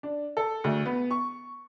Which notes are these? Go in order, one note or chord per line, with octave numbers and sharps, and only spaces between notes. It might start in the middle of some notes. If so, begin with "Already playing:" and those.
D4
A4
D2
B3
C#6